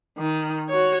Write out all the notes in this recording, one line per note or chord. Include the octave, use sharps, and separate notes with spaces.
D#3
F#4 C#5